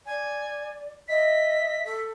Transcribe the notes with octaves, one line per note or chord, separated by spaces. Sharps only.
D5 G#5
D#5 E5 B6
A4